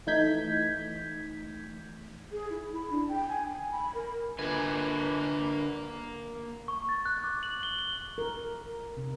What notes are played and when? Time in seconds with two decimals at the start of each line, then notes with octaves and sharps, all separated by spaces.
0.07 E3 A3 D#4 G6 G#6 B6
2.32 G#4
2.50 E4
2.74 B5
2.90 D4
3.09 G5
3.29 G#5
3.51 G#5
3.71 B5
3.95 A#4
4.39 D3 A#3 B4 G#5
6.68 C#6
6.89 A6
7.06 F#6
7.24 D6
7.43 F#7
7.63 G7
7.79 G7
8.18 A#4
8.97 C3